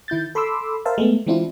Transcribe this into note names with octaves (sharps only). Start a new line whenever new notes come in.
D#3 E4 G6 A6
A4 B5 C6 D6 E6
A#4 C5 E5 F5 A5
G#3 A3 B3
E3 G#3 C4 D4 E4 F4